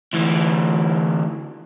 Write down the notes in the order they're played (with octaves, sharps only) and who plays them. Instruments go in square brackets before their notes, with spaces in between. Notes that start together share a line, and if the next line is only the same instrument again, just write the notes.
[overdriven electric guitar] D2 E3